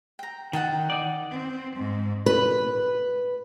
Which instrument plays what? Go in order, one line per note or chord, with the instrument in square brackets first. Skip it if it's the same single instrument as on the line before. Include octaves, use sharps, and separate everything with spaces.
[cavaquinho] G5 A#5
[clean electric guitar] D#3 [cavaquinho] F#5 G5 A5
[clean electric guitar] D#4 D5
[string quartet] C4
G#2
[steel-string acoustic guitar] B4